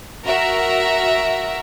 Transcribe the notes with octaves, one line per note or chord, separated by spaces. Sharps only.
F#4 A#4 E5